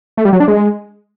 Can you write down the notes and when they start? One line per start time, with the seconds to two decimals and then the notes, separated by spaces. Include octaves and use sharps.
0.17 A3
0.25 G3
0.33 F#3
0.40 D4
0.48 G#3